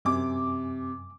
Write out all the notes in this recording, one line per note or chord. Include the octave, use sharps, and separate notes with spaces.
F#2 C3 G#5 D6